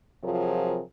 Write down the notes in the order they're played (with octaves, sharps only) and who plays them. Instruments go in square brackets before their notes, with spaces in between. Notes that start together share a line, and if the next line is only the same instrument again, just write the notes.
[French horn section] C3 F3 F#3 F4 G#4 A#4